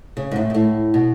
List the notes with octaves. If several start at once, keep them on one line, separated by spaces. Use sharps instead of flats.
C#3
G#2
A2
G#2
A2
B2